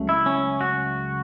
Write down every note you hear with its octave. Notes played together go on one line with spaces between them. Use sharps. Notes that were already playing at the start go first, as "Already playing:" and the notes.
Already playing: C#2 C#3 F#3 A3
E4
C#4
F#4